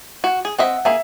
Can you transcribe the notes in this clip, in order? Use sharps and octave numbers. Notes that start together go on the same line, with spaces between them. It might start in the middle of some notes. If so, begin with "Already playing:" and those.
F#4
G#4
C4 D#5 E5 F#5
A#3 G#4 E5